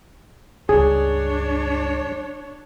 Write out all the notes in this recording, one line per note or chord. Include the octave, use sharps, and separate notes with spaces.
C#2 G2 D4 G#4 C#5